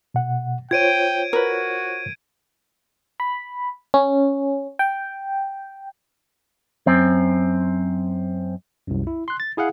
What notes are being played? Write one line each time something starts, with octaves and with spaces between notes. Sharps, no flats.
B2 F#5
F4 C5 C#5 G5 G#6 D7 D#7
F#4 A#4 B4
B5
C#4
G5
F#2 C4
C2 F#2
E4
C6 F#6
A6
E4 G#4 F5 F#5